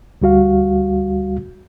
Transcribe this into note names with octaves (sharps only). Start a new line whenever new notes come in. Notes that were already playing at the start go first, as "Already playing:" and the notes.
D2 G3 F#4 F5